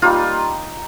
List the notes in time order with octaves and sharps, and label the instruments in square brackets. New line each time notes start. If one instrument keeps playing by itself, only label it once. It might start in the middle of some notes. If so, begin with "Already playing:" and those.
[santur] G3 A#3 D#4 F4